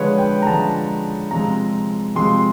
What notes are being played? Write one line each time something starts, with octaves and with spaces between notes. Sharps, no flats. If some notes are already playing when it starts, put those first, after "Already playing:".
Already playing: D3 F3 G#3 B4 C#5
G5
A#5
D3 F3 G#3 A5
C3 F3 G#3 A#5
C3 F3 G#3 C6